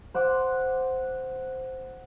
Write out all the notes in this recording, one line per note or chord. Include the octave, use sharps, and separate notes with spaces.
C5 F#5 D6